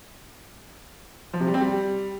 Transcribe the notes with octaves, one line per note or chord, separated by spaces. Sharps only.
F3
C3
G3
C4
G3